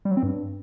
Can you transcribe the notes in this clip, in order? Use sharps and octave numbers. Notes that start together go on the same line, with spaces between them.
G3
F#3
C4
G2